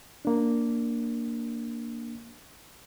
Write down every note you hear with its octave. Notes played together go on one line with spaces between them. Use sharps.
A#3 D4